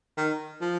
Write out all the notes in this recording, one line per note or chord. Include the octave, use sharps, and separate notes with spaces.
D#3
F3